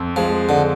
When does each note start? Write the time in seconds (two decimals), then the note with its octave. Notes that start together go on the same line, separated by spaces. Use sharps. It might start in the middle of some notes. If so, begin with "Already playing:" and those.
Already playing: F2
0.16 F3 G#3
0.49 D3